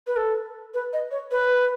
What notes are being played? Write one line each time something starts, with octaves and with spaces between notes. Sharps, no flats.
B4
A4
B4
D#5
C#5
B4